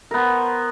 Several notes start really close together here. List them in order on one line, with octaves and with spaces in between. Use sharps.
A#4 B3 C5